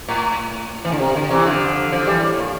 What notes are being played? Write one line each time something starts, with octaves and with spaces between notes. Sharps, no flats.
A2
E3
D3
C3
D3
C3 E3
D3 F3
D3 F3
E3 G3
A2
A#2